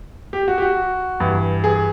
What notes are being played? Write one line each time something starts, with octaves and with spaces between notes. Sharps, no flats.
G4
F#4
G4
F#4
G2 E3
G#4